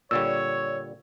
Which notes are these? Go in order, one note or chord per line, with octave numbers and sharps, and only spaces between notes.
A#2 D3 G3 C#5 E6